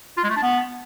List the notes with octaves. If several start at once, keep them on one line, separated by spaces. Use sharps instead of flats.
F4
G#3
A3
D4
B3